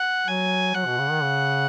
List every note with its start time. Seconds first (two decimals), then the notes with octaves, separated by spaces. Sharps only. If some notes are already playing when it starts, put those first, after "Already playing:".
Already playing: F#5
0.27 F#3 G#5
0.74 F#3 F#5
0.86 B2
0.98 C#3
1.11 D#3
1.22 C#3